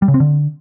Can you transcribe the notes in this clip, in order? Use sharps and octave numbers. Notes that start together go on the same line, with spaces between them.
G3
C#3
C4
D3